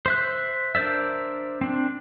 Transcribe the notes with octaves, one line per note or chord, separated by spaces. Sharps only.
C5 E5 F#6
D4 A#4 C5 D5 E5
C4 D4